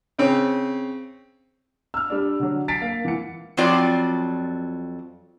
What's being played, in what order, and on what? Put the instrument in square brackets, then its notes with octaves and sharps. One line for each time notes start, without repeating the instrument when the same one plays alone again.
[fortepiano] C#3 C4 C#4
[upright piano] E6 F6
G3 D4
D3 F#3
A6 B6 C7 D7
A#3 F5
E3 F#5 C#7
[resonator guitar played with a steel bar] F2 F#3 C4 F4 D5